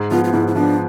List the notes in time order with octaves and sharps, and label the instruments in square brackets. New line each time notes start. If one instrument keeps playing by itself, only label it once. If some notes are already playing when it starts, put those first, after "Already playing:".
Already playing: [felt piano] G#2
[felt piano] F3 B3 [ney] F4
[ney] F4
[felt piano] G#2 [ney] E4
[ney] E4
[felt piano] F3 B3 [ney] D4